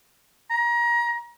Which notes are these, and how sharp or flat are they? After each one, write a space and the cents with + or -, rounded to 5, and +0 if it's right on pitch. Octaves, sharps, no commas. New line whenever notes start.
A#5 +30